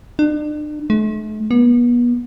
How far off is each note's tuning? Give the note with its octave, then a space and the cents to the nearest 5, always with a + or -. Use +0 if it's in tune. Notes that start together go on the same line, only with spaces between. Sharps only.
D4 +40
A3 -45
B3 -35